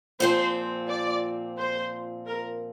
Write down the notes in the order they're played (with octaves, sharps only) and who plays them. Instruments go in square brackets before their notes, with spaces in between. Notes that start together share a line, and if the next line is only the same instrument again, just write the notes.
[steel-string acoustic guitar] A#2 F3 C4 [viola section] C5
[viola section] D5
C5
A#4